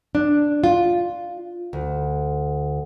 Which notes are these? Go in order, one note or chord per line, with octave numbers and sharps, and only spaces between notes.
D4
F4
D2